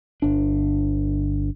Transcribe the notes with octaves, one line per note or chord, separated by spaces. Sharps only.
G1 D4